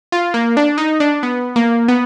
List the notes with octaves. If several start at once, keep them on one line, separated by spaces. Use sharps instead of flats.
F4
A#3
D4
D#4
D4
B3
A#3
B3